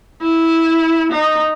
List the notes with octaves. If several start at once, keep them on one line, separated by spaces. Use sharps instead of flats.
E4
D#4